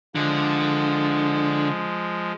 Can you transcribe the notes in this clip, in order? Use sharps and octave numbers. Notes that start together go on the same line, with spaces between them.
D3 F3 G#3